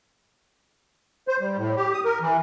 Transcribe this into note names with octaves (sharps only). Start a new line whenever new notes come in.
C5
G3
A2
G4
D#6
A#4
E3